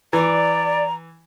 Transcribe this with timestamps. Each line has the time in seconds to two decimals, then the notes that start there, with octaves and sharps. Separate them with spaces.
0.13 E3 D5 A#5